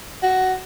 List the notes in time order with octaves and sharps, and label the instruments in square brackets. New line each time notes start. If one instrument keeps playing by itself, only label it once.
[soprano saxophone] F#4